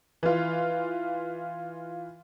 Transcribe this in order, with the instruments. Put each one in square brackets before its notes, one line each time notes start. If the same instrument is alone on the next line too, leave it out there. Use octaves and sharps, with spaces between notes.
[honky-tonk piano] E3 F4